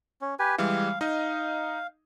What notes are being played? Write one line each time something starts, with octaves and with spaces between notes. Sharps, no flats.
C#4
G4 B4 G#5
E3 G3 G#3 F5
D#4 D#5 F5